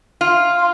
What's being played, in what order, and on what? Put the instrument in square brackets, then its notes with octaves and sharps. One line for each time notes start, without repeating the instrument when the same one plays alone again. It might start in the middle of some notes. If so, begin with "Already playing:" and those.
[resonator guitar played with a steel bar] F4